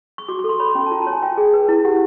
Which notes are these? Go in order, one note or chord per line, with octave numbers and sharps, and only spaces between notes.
C#6
F#4 D6
C#6
A4 C6
C#5 B5
C#4
A5
F4 A#5
A5
C#5
G#5
F4 G5
G#4
B4
E4
G4 F#5